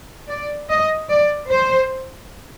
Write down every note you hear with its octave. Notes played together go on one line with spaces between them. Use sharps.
D5
D#5
D5
C5